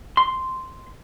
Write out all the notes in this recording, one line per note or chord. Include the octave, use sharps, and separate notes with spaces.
C6